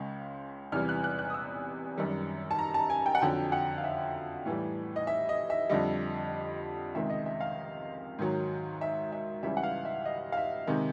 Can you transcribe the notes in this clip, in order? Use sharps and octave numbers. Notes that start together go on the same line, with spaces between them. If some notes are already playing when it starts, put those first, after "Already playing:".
Already playing: C#2 C#3 G#3
E2 C3 E3 G3 F6
F#6
F#6
F#6
D#6
E6
F#2 D#3 G3
A5
A#5
A5
G#5
G5
F#5
F2 D3 F#3 G5
F#5
F5
E5
A2 E3 G3
D#5
E5
D#5
E5
F2 D3 G3 D#5
C#2 C3 D#3 G#3 E5
D#5
E5
F5
G#2 D#3 F#3
E5
E5
C#2 C#3 E3 G3 E5
F#5
F5
E5
D#5
F5
E5
C3 D#3 G#3